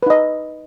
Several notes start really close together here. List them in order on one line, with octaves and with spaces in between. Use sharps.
B4 D#4 D#5